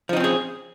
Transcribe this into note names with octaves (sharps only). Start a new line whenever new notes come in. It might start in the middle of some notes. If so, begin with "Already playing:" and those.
F3 C4 C#4 D#4 G#4